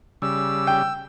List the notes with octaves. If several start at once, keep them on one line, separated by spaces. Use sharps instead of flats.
C#3 G3 E6
G5